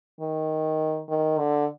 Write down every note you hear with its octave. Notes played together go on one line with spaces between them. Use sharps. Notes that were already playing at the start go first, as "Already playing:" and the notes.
D#3
D#3
D3